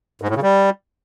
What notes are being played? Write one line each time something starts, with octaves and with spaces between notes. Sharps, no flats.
G#2
A2
C#3
G3